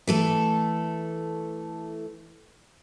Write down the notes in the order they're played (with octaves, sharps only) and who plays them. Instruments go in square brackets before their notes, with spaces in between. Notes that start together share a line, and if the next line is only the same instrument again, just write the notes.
[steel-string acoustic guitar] E3 A3 A4